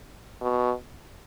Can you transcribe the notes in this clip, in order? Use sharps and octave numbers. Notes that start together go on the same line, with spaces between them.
B2